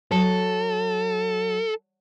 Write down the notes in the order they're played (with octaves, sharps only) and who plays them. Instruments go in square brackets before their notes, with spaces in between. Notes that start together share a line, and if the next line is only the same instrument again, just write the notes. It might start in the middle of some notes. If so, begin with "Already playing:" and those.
[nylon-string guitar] F#3 [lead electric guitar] A4